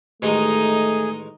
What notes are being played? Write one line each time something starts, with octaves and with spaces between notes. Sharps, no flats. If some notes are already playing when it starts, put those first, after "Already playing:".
A1 D#3 G#3 A3 D#4 G#4 D#5